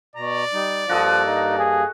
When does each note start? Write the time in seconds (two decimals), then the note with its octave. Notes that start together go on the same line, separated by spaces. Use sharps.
0.16 B2 D5 A#5
0.53 G3 D#4
0.89 G2 F3 A#3 F#4 A4 D#5
1.25 D#4
1.58 G#4